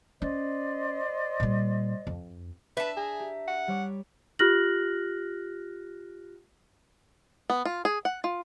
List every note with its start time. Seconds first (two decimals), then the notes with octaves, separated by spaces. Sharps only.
0.22 C#4 C5 D5 D#5
1.40 A#2 G3
2.07 F2
2.77 D4 B4 E5 A5
2.97 G#4 A#5
3.20 G4
3.48 F#5
3.68 G3 C#5 D6
4.39 F4 G4 F6 F#6 A#6 F#7
7.50 B3
7.65 F4
7.85 G#4
8.05 F#5
8.24 F4